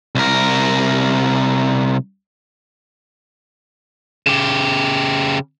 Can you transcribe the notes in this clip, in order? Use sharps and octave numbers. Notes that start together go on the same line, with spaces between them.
C2 A#4
C#3 G4